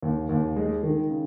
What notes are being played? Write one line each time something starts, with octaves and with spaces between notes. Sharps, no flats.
D#2
D#2
G#3
D#3
C#3